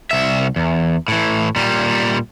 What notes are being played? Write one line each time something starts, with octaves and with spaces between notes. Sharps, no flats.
C2 E5
E2
A2 E3
A#2 G3